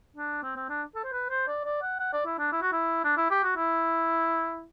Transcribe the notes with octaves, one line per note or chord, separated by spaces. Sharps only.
D4
C4
C4
D4
A4
C5
B4
C5
D5
D5
F#5
F#5
D5
E4
D4
E4
F#4
E4
D4
E4
G4
F#4
E4